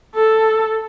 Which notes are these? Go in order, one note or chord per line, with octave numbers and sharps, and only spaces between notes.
A4